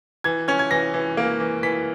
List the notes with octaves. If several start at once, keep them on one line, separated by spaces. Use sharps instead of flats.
E3 G#6
C#4 G#6
G#6
E3 A#6
E3
A#3
E3
E3 B6